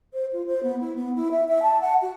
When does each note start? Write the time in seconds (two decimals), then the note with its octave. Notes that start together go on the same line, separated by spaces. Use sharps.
0.13 C5
0.33 F4
0.47 C5
0.63 B3
0.81 E4
0.96 B3
1.16 E4
1.31 E5
1.48 E5
1.63 A5
1.81 F#5
2.02 F#4